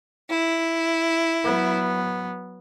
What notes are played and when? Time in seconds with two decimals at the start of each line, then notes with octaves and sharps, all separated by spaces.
0.30 E4
1.44 F#3 B3